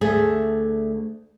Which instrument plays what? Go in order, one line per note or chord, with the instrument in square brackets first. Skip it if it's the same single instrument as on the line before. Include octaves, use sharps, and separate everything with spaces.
[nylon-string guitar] D2 A3 G#4